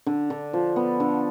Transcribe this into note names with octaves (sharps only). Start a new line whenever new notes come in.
D3
D3
F3
B3
D3